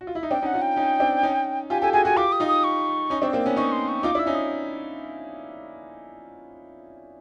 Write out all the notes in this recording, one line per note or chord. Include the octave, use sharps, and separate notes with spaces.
F#4
F4
E4
D#4
C4 D4 G5
C#4 D#4
F#5
D#4 F4
G5
C#4 D#4
C4 D4
C#4 D#4
F4 G4 G#5
G4 A4 G#5
F#4 G#4 G#5
F#4 G#4 G#5
F4 G4 D6
D#6
D#4 F4
D#6
C#6
C#4 D#4
C4 D4
A#3 C4
B3 C#4
C#4 D#4 C#6
C6
C#6
D#4 F4 D6
D4 E4
E6
C#4 D#4
D#6